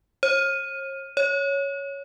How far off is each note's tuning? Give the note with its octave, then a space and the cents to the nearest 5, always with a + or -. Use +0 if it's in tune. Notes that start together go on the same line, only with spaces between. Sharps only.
C#5 -45
C#5 +5